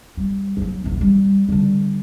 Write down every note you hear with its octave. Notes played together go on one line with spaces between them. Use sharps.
G3
F#3 A#3
A#1 E2
G3
D3 G3